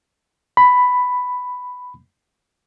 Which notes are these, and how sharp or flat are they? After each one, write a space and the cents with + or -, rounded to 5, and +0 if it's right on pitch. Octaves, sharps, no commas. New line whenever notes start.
B5 +5